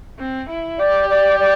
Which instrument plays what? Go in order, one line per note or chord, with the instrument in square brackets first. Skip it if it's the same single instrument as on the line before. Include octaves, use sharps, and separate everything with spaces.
[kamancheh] C4
E4
[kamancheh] G4 [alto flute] D5
[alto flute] D5
D5